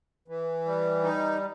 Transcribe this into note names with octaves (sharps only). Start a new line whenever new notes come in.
E3
G3
D#4